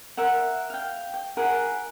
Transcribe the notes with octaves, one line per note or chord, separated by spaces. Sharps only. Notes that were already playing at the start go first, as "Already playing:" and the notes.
A#4 E5 F#5
F5 G5
G5
E4 G#4 A#4 F#5